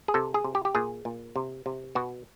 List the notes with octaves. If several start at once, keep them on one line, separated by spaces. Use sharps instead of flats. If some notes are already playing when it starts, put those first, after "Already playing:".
G#4
C3 A4
G#4
C3
G4
G4
A#2 G#4
A#2
C3
C3
B2 F#4